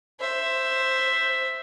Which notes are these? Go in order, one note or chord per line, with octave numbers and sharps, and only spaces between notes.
C5 E5